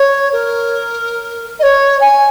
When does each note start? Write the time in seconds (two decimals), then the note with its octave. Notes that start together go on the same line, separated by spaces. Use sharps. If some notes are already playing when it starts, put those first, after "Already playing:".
Already playing: C#5
0.32 A#4
1.59 D#5
1.62 C#5
2.00 G#5